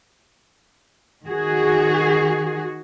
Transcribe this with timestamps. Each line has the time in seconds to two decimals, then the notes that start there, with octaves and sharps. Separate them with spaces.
1.26 D#3 F#4 G#4